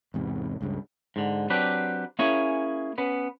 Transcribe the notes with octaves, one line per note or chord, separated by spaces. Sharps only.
E2 G#2 C3
C#2 G2 C#3
G#2 D3
F#3 C4 D4 G4 B4
A#3 C#4 E4 G#4 C#5 G#5
B3 C#4 B4